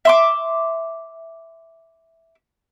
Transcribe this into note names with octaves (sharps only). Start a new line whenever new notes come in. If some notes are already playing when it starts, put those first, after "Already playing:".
E5 C6 D6